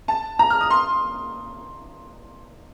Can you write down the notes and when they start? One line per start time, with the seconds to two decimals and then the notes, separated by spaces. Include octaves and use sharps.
0.08 A5
0.39 A#5
0.50 F6
0.61 D#6
0.70 C6